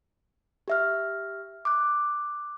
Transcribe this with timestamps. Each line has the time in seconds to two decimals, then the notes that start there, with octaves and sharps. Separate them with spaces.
0.68 G4 E5 F6
1.65 D6 F#6